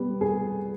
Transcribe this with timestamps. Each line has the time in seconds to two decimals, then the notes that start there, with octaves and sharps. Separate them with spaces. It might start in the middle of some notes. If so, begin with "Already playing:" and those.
Already playing: G3 B3
0.21 G#4